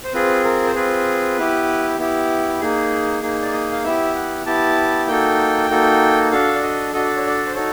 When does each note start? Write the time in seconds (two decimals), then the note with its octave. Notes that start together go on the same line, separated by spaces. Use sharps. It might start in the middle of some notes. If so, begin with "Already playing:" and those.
0.04 C5
0.13 C4 F4 G#4 B4
0.44 A#4
0.67 C5
0.75 C4 F4 G#4 B4
1.37 B3 E4 G4
1.98 B3 E4 G4
2.60 A#3 D#4 G#4
3.22 A#3 D#4 G#4
3.42 D5
3.53 D#5
3.72 F5
3.84 B3 E4 G4 E5
4.15 F#5
4.45 B3 E4 G4 A5
5.07 A#3 D#4 F#4 A4 G5
5.70 A#3 D#4 F#4 A4
6.32 D4 F#4 A4 F5
6.55 D5
6.63 D#5
6.93 D4 F#4 A4 D#5
7.05 D5
7.17 C#5
7.27 D5
7.47 C5
7.55 D#4 F#4 A4 C#5